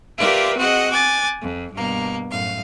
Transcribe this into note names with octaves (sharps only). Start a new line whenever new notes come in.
F4 G4 A#4 B4 D5 E5
C4 F#4 G#4 D#5 F#5
G#5 D6 F#6 A6
F2
G2 B2 A#3
F#2 A2 F5